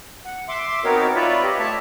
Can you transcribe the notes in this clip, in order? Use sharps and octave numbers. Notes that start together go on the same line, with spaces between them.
F#5
E5 C6 D6
B3 C4 D#4 F#4 A#4 C#5
F4 B4 C#5 D5 E5
G4 D#5
A3 C#5 E5 A5